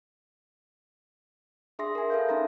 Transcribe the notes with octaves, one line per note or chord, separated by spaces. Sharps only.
D4 G#4 E5 C6 D#6 A#6
A#4 G#5
A4 B4 E5 F5 G6
C#4 D#4 A#5 C6 A#6